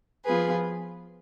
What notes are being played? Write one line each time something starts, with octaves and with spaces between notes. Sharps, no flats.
F3 B3 F4 G#4 B4